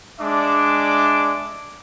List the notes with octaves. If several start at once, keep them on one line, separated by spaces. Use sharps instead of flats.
G#3 D4 E5 D6